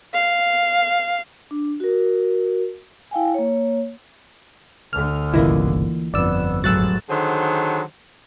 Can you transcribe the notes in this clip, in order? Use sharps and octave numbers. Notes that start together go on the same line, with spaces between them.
F5
D4
F#4 A#4
E4 F5 G5 G#5
A#3 C#5
D2 D3 F6
G1 C2 C#3 E3 A#3 E4 F4 D#5
G1 F2 B3 D5 E6
A1 G#2 F#3 F#4 E6 F#6 A6
D3 D#3 F#3 G#4 C5